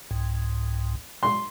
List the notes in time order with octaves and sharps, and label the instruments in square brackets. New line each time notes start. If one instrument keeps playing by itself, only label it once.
[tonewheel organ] C2 G#2
[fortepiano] C6